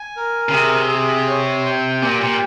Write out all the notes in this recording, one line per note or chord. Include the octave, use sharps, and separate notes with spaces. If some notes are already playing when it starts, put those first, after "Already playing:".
Already playing: G#5
A#4
C#3
C3 G#4
G#4
C#5
G5
A#2 G4
A#2